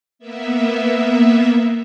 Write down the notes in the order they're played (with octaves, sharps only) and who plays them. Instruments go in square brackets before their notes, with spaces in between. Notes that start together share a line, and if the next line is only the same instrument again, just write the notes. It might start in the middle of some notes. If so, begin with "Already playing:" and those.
[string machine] A#3 B3 E5